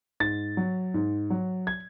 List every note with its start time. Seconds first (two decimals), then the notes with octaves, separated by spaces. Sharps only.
0.20 G#2 A6
0.57 F#3
0.94 G#2
1.30 F#3
1.67 G#6